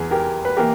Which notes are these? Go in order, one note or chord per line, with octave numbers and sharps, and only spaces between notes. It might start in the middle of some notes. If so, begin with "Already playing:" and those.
Already playing: E2 E3 G#4
G4 A#4
B4
E3 A#3 G4 A#4